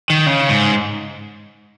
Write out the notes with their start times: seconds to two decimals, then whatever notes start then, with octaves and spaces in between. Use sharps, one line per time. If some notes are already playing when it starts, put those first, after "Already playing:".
0.10 D#3
0.26 C#3
0.49 G#2